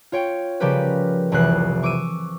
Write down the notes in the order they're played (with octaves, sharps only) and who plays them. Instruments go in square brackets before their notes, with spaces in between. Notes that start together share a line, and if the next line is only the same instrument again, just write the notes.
[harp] F4 C#5 G5
C#3 F3 G3 G4 A#4 B4
F1 C2 C3 E3 F#6 C7
C#6 D6 E6 D#7